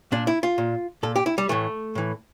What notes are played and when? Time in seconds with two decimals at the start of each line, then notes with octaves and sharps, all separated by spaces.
0.12 A#2 D4
0.27 E4
0.43 F4
0.58 A#2
1.03 A#2 A4
1.16 G4
1.26 E4
1.38 G3
1.49 A2 E3 A3
1.95 A2 E3